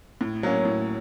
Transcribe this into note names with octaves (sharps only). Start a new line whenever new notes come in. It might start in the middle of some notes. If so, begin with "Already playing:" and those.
A2
F#3 A#3 C#4
A2